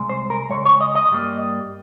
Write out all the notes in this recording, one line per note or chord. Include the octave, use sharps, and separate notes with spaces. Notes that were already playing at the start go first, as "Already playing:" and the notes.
Already playing: C2 G#3
C5
A#4
C#2 C#3 G#3 C#5
C#5
D#5
D#5
G2 G3 A#3